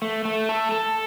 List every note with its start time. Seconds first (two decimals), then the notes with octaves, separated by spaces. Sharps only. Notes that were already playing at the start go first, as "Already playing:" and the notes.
0.02 A3
0.25 A3
0.49 A4
0.72 A4